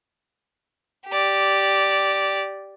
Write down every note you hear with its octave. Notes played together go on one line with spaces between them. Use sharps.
G4 D5